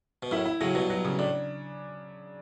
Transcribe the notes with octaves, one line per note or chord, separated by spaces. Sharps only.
B2
F#2 A2 E4
E4
A2 C#3 F#3
G2 B2 F#3
F#3
C#3
A2 D4